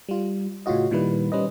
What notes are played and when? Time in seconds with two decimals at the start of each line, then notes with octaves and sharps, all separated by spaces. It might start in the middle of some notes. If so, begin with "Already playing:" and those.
0.09 G3 F4
0.66 A2 C#3 C#4 F4 F#4 D#5
0.91 A#2 D#3 G3 E4 B4
1.32 G3 C#4 B4 C5 D#5